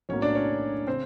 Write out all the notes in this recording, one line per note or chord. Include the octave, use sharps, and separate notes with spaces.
B1 A2 F#3 A#3 C#4 C#5
D4 D5
C#4 C#5
C#3 C4 C5